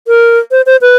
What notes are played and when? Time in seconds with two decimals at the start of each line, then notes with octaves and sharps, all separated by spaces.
0.07 A#4
0.51 C5
0.66 C5
0.81 B4